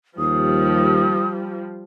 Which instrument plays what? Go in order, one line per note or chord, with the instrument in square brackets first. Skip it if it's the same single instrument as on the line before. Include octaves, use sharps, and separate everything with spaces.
[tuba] D#2 [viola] F3 G3 [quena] D#6